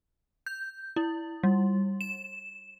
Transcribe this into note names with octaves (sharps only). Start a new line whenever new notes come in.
G6
E4
G3
E7